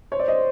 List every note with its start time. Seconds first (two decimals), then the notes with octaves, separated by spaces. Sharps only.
0.11 C5 C#5
0.19 D5
0.28 D#5